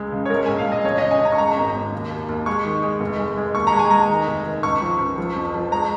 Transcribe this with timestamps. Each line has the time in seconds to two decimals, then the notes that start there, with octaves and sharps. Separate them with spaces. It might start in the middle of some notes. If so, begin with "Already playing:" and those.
Already playing: C#2 G#3
0.12 C#3
0.25 C#5
0.30 G#3 A#4
0.46 A#1 G#5
0.58 F5
0.66 G#3
0.72 D#5
0.84 F2 C#5
0.98 D#5
1.03 C#3
1.11 G#5
1.20 C#3 A#5
1.32 C#6
1.38 G#3 A#5
1.57 G#1
1.74 G#1
1.92 D#2
2.11 D#2
2.29 D#2
2.46 G#3 C#6
2.65 D#3
2.83 G#3
3.00 F1
3.19 G#3
3.37 G#3
3.55 D#2 C#6
3.67 A#5
3.73 G#3
3.79 G#5
3.90 G#3 A#5
4.09 D#3
4.27 F1
4.46 D#3
4.63 C#2 C#6
4.82 F3
5.00 C#2
5.18 F3
5.36 F2
5.55 F3
5.71 G#3 A#5